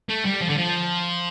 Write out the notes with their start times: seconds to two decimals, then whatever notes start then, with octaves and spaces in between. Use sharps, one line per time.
0.09 A3
0.25 G3
0.41 F3
0.49 D3
0.57 F3